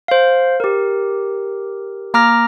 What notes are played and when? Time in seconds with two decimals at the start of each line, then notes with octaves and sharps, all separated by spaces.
0.08 C5 F5
0.60 G4 A#4
2.14 A#3 A#5 D6 F6 A#6